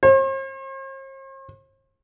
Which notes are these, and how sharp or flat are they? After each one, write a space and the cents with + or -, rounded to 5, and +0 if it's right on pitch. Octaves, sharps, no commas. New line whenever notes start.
C5 +45